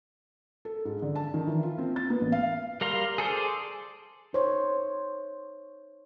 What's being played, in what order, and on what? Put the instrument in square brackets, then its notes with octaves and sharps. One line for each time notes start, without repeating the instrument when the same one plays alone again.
[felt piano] A4
G#2
D3
A5
D#3
E3
F4
C4
A6
B3
A1
F5
[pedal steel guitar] G3 A#4 F5 A#5 C6
G#4 A4 C5 D5
[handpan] D#4 C5 C#5